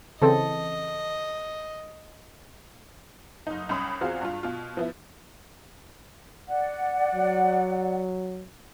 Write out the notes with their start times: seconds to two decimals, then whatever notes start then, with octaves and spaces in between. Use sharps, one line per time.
0.22 C#3 E3 C4 A4 D#5
3.47 F#1 D#4
3.69 C2 C#4 B5 D#6
4.01 E2 C4 F4 F#4 G#4 F5
4.21 G2 F4
4.43 B2 F4
4.77 F3 B3 E4
6.49 D5 F#5
7.15 F#3